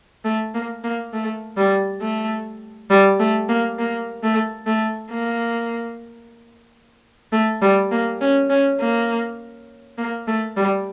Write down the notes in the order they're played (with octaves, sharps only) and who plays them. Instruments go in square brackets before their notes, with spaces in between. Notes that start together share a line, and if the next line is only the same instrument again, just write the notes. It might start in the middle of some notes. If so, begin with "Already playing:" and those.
[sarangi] A3
A#3
A#3
A3
G3
A3
G3
A3
A#3
A#3
A3
A3
A#3
A3
G3
A#3
C#4
C#4
A#3
A#3
A3
G3